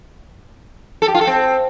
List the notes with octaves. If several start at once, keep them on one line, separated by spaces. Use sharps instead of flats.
A4
G4
F4
A4
C4